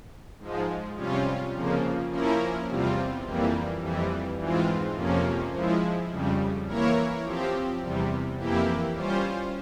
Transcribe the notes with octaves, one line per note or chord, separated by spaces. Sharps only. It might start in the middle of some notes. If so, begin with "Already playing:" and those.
G#2 F3 G#3
C3 G3 C#4 F4
F2 C#3 F3 A#3
F3 A#3 C#4 E4 A#4
E2 C3 G3 C4 F4
F2 E3 G3 A#3
F2 E3 G3
G#2 E3 G#3 C4 F4
F2 C3 F3 A#3 C#4
F3 G#3 E4
F2 C#3 G3
E3 A#3 E4 A#4 C#5
F3 C4 G4
E2 C3 G3
F2 E3 A#3 E4 G4
G3 C#4 F4 C5